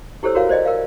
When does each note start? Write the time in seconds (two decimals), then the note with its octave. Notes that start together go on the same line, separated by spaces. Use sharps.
0.23 E4 G4 A4 C5 C#5 E6
0.35 F#4 A#4 C#5 F5
0.49 C5 D5 D#5 G5
0.65 A#4 F5